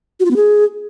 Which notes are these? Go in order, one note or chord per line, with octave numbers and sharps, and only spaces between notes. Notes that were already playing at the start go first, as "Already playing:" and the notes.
F#4
F4
B3
G#4